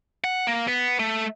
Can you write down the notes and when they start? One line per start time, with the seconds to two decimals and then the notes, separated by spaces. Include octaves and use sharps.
0.24 F#5
0.47 A#3
0.68 B3
0.99 A3